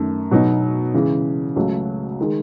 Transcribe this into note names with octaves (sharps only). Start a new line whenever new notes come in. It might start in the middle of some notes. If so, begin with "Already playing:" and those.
Already playing: F#2 D#3 A3
B2 F#3 B3 D#4
C#3 E3 G#3
C#2 C#3 F#3 A3
D#3 G#3